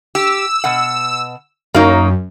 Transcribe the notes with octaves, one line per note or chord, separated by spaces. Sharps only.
G4 E6
B2 F#5
F#2 A#3 D#4 C#5